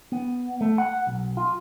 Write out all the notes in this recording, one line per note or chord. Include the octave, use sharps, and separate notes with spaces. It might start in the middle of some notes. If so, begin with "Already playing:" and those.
B3
A3
F#5
B1
F4